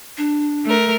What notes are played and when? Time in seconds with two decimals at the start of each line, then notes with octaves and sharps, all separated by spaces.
0.18 D4
0.65 A3 A#4